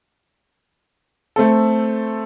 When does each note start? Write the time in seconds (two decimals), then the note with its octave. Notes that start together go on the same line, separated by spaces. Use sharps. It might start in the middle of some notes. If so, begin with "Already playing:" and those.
1.36 A3 C4 A4